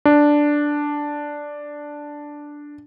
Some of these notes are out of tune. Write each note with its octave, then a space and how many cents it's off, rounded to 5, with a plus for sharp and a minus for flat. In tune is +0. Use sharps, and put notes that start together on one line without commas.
D4 +0